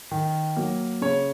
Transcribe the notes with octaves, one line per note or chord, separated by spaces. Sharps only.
D#3
F#3 A#3
C#3 C#5